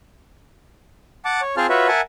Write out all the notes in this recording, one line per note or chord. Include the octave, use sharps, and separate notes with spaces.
F#5 A5 D6
C#5
C4 F4 G#4 C5 A5 F6
F4 F#4 B4 C#5 E5
A#4 E5 F#5 G#5 A5